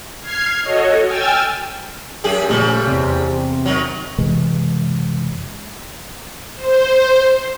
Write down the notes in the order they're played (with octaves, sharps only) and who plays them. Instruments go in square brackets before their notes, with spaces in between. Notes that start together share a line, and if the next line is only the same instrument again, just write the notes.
[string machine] F6 G#6 C7
F#4 A4 C#5 D#5
G5 G#5 E6 F6 G#6 A6
[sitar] F#2 G4 G#4
[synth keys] A#2 F3 A3 [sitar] C#3 G3
[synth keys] E2 C3
[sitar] D#3 F#3
[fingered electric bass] F#1 C3 E3 G#3
[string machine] C5